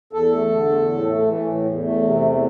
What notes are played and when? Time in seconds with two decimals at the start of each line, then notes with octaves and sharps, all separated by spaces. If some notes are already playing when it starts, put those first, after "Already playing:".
0.13 E2 A4
0.32 A3
0.51 D3
0.70 E2
0.89 A2
1.08 A3
1.27 E3
1.46 A2
1.65 E2
1.84 A3
2.02 C3
2.21 E2